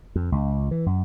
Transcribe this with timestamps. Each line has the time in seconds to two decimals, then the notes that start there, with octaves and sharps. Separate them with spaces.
0.16 F2
0.32 C#2
0.71 E3
0.86 F#2